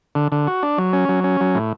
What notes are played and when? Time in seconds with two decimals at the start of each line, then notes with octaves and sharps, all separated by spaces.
0.15 D3
0.32 D3
0.47 F#4
0.63 D4
0.78 F#3
0.93 C#4
1.09 F#3
1.24 C#4
1.41 F#3
1.55 A2